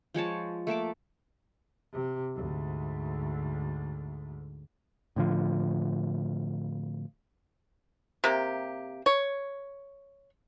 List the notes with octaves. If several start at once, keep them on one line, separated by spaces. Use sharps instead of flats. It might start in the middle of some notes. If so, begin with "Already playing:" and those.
F3 G#3 C#5 A5
A3 A#3 A5 D6
C3
D2 G#2
A2 D3 F3
C3 A#3 G4
C#5